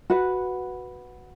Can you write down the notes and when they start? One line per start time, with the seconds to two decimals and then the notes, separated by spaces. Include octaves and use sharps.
0.10 F#4 B4 F#5